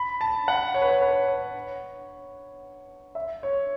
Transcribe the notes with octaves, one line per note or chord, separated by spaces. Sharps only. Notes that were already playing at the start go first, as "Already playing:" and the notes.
Already playing: B5
A5
F#5
C#5
B4
C#5
B4
C#5
E5
C#5